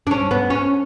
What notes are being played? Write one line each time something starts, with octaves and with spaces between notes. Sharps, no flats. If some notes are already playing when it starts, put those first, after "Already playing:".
D4
C#4
B3
C#4